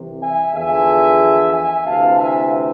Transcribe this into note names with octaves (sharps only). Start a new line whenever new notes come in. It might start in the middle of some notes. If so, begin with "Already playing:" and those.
Already playing: C2 C3 E3
E5 G#5
E2 D3 F3 E5 G#5
E5 G#5
D2 C3 E3 F5 A5
E5 G#5